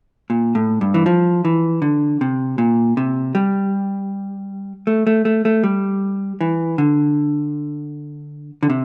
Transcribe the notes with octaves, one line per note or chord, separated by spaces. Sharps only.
A#2
A2
G2
E3
F3
E3
D3
C3
A#2
C3
G3
A3
A3
A3
A3
G3
E3
D3
D3
C3